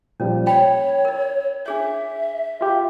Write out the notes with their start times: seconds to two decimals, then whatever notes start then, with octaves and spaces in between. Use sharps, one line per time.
0.20 A#2 F3 G3 C#4
0.47 C#5 G5 B5
1.05 A#4 D#5
1.66 D4 G#4 C#5 E5
2.61 F4 G4